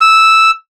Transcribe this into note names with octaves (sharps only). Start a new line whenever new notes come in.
E6